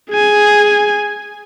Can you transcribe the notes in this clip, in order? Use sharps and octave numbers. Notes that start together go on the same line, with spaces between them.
G#4 G#5